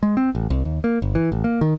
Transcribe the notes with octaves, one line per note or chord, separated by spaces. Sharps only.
G#3
C4
A1
C2
D#2
A#3
G1
E3
A1
A#3
D#3